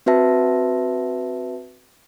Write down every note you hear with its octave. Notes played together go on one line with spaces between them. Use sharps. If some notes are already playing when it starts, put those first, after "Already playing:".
C4 F#4 B4 E5 A5